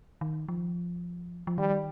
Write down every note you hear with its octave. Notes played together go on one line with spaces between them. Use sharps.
D#3
F3
F3
D#3 G3